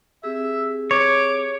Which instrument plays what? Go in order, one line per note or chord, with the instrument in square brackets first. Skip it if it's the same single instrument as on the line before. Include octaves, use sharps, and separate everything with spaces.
[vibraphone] C4 G4 G#4 [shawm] E5
[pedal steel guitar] C#5 [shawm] D6